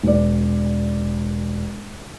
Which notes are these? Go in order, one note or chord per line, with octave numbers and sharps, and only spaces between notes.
E1 D5